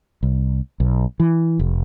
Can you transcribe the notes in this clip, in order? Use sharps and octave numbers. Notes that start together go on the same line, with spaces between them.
C2
B1
E3
F1